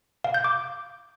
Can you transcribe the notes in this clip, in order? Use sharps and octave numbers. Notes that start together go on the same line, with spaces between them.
F5
G6
D6